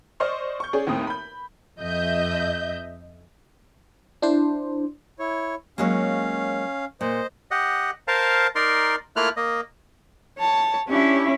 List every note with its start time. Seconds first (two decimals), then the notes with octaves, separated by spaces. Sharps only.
0.20 C5 D5 D#5 C6 C#6 F6
0.60 C#6 G6
0.73 C#4 G#4 C#5 D5
0.87 D#2 A2 C4 D#6
1.07 B5 G6
1.80 F2 D#5 E5 G6
4.22 D4 E4 C5
5.19 E4 C#5
5.78 F#3 G#3 A#3 C#4 F5
7.01 A#2 C5 D#5
7.51 G4 D#5 F#5
8.08 A#4 C5 F5 A5
8.55 D#4 A#4 D5 C6
9.16 A3 A#3 E4 F4 F6 F#6
9.36 A#3 D#5
10.39 C#5 A5
10.89 C#4 D4 E4 G4